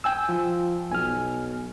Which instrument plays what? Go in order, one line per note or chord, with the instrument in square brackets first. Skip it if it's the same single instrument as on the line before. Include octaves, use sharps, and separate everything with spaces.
[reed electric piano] G5 G#5 E6
[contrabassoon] F3
[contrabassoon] B1 [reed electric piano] G#5 F6